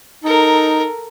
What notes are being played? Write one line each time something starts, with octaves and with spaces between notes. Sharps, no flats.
D#4 A4 A#4